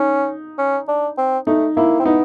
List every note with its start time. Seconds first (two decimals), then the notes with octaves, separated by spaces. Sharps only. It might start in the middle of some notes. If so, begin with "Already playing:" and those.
Already playing: C#4 D#4
0.58 C#4
0.88 D4
1.18 C4
1.47 A3 D#4
1.77 A#3 E4
2.00 C4
2.05 B3 D#4